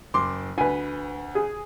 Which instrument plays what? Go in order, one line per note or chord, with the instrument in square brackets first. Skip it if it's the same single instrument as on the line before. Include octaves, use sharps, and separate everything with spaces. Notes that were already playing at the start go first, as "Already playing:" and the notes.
[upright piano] F#1 C6 D6
[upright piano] D2 [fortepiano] B4 G#5
[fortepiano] G#4